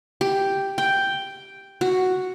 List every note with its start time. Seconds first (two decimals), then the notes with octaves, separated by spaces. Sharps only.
0.21 G4
0.78 G5
1.81 F#4